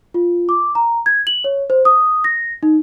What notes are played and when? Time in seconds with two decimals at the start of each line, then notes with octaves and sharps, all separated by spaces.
0.14 F4
0.49 D6
0.75 A#5
1.06 G#6
1.27 F#7
1.44 C#5
1.70 C5
1.85 D#6
2.24 A#6
2.63 D#4